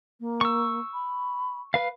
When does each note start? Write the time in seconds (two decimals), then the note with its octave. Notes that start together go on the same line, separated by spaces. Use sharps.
0.20 A#3
0.41 C#6 E6
0.93 B5
1.74 B4 F5